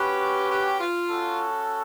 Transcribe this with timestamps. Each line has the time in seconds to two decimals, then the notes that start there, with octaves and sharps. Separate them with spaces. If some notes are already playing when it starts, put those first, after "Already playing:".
Already playing: C#4 F#4 G4 B4
0.50 G4
0.80 F4
1.09 C#4 F#4 A4